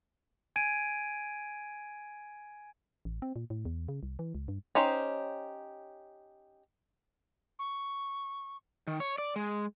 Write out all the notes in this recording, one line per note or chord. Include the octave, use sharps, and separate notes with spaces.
G#5 G#6 D7 D#7
A1
C4
A#2
A2
E2
C#3
C2
E3
C#2
G2
C#4 D#4 G4 C5
C#6
D#3
C#5
D5
G#3